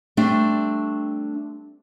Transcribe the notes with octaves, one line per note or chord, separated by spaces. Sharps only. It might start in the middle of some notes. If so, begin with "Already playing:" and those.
G3 A3 C4 D4